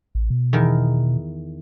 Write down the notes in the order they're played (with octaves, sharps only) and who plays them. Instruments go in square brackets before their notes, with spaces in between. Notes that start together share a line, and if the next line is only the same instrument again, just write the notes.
[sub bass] A1
B2
[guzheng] E2 D#3 A#4